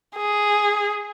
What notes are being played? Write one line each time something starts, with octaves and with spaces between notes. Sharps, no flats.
G#4